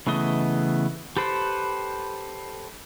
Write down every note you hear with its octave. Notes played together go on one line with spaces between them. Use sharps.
C#3 E3 A3 B3 D#5
G4 A4 B4 C5 G5